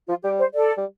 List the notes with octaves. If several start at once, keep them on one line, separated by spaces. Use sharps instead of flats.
F3 F4
G3 G4
C5
A4 D5
G3